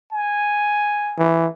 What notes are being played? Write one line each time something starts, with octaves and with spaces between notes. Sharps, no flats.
G#5
E3